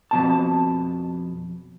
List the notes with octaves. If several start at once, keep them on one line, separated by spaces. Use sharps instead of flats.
F2 B2 A5